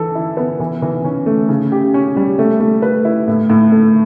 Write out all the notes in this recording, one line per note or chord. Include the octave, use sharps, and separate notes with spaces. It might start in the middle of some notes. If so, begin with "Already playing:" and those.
Already playing: E3 A4
E4
B3
E3
E3
C#4
A3
C#3
G4
C#4
G3
A3
A3
B4
E4
A2
A2
A3